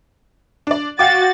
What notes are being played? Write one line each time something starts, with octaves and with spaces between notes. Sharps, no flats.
D4 D5
F#4 F5 G5 D6 A6